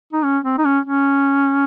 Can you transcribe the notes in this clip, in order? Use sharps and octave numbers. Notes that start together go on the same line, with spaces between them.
D#4
C#4
C4
D#4
C#4
C#4